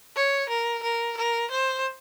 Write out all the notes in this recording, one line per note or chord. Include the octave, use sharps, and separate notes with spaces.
C#5
A#4
A#4
A#4
C5